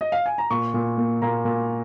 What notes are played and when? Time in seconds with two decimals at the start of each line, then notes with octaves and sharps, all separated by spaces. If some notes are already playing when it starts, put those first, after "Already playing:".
0.01 D#5
0.12 F5
0.26 G#5
0.38 A#5
0.50 A#2 C#6
0.74 A#2
0.97 A#3
1.22 A#2 A#5
1.45 A#2